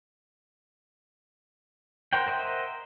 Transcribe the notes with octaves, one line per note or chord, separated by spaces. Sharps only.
A#4 C5 C#5 F#5 G5
A#4 C5 D#5 E5 F#5